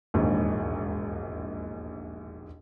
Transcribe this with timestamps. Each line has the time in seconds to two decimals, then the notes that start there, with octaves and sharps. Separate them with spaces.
0.14 E1 A#1 D#2 G#2